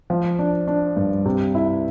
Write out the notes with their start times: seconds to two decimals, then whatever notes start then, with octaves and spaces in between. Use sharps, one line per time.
0.10 F3
0.39 D4
0.68 D4
0.97 G2
1.26 C3
1.55 E4